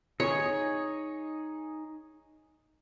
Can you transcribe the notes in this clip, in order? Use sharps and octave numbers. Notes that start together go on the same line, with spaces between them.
D#4 G#4 C#5